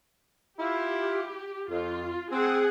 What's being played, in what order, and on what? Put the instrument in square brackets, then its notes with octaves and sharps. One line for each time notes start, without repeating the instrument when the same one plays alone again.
[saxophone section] E4 F4 [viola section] G4
[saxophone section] F2 [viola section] F4
[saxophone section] C4 [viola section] G#4 F#5